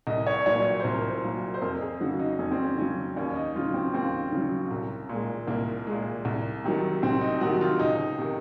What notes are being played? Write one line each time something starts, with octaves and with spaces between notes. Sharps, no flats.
C2 D#5
C#5
A#2 F#3 C#5
C#5
C2 C5
A#4
C5
A#2 F#3
C5
F2 A#4
G#4
C#3 F#3 F#4
D#4
F2 C#4
C4
C#4
C#3 F#3 C#4
D#2 C#4
D#4
C#3 F#3 F4
C4
D#2 C4
C#3
F#3
C2
A#2 G#3
C2 A#3
A#2 G#3
C2
C3 D#3 F#3
C2 C4
D#4
C3 D#3 F#3 F#4
F4
C#2 D#4
C3 D#3